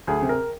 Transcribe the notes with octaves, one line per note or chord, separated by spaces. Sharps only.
D2 G#4
C3
A#4